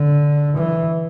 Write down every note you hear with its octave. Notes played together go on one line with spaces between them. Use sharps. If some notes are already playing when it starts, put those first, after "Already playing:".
Already playing: D3
E3